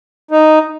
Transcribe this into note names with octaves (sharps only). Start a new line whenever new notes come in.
D#4